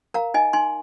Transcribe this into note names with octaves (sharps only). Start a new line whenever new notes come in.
A#4 F5 A#5
D#4 D#5 G#5
D#4 G#5 C6